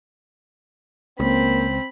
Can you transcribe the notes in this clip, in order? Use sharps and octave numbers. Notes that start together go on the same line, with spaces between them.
C#2 A#3 C4 B5